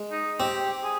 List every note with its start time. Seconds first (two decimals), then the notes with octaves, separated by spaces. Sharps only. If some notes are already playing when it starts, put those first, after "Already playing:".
Already playing: G#3
0.12 D#4
0.40 C4 G4
0.83 G#4